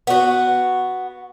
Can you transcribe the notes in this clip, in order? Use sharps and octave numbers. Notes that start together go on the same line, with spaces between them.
B3 F#4